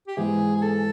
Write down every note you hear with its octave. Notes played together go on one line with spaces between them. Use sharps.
G4
G#2 E3 G#3 B3 E4 G#4
G#4
A4